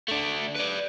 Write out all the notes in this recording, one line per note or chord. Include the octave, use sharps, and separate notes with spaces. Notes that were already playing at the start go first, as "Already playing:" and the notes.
A3 D4
B4 D5